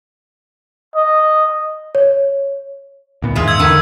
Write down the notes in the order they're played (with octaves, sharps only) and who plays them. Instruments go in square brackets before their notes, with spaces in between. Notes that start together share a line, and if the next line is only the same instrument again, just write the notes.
[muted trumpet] D#5
[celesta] C#5
[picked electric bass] D2 A#2 B3
[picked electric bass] E2 G#2 D#3 [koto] G#3 F4 E5
[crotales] E6 G#6
[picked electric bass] E2 [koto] D3 D#3 B4